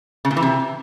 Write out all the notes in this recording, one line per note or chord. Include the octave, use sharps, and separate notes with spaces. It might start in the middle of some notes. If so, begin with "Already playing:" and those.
C#3
A#2
E3
C3